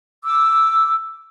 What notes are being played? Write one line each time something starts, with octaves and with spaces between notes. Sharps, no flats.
D6 E6